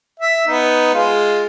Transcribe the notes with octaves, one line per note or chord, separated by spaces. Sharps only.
E5
B3 D#4
G#3 F4